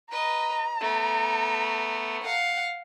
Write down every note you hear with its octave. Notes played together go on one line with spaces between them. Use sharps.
B4 D#5 A#5
A3 B3
F5 F#5